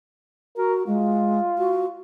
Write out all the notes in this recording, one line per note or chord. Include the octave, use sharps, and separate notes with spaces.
F#4 A#4
G#3 F4
F#4